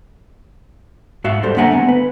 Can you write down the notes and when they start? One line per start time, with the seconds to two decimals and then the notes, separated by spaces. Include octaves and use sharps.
1.24 G#2 F#4 E5 F5
1.43 G3 A4 C5
1.57 D3 A#3 E5 F#5 G#5 A#5
1.72 A3 B3
1.89 B4